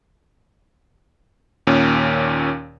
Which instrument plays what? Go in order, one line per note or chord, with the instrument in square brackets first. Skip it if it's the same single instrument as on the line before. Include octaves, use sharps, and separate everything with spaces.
[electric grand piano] D#2 A#2 C#4